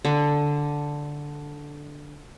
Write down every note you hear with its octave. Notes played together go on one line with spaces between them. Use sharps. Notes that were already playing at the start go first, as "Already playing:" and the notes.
D3